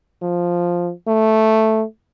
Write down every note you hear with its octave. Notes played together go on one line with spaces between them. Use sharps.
F3
A3